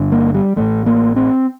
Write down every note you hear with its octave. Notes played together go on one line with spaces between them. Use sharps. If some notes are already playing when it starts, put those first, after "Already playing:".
Already playing: G1 G2 D3
A#3
G3
A1 A2 A3
A#3
C4